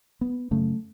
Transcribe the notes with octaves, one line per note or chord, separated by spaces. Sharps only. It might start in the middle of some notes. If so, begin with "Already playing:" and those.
B3
F#2 C#3 A3